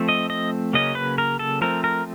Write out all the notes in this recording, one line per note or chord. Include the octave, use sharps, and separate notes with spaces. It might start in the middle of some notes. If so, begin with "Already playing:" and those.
Already playing: F3 A3 C4
D#5
D#5
C#3 F#3 A#3 C#4 D#5
B4
A#4
A4
F3 A3 C4 A#4
A#4